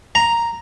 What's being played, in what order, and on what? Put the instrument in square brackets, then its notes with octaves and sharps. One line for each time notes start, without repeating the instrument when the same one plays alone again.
[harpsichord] A#5